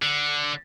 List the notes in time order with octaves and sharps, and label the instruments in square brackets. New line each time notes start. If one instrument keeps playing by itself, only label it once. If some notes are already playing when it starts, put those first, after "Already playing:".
[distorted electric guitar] D3